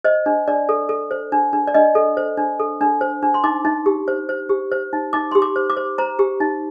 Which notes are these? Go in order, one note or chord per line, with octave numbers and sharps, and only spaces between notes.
C5 D#5
D4
D4 D5
A4
A4
C5
D4
D4
D5
D4 D#5
A4
C5
D4
A4
D4
C5
D4
C6
D#4 D6
D#4
G4
C5
C5
G4
C5
D#4
D#4 D6
G4 C6
D6
C5
D6
C5
C5 A#5
G4
D#4